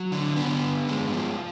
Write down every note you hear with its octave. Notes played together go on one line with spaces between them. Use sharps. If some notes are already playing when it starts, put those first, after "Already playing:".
Already playing: F#3
D3
D3 B3
G2
G#3
F3